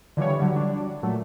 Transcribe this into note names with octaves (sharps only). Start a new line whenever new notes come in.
D3 E3 F3 G3 C#5
D3 F#3 G3
D4
A#2 F#3 A3